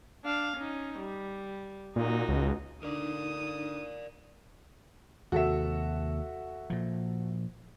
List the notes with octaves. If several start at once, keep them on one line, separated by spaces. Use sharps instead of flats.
D4 F5
C#4 D#4
G3
A#2 D#4 F#4
C#2
D3 D4 D#4 A#4 D5 D#6
D#2 C3 F#4 A4 E5
A#2 F3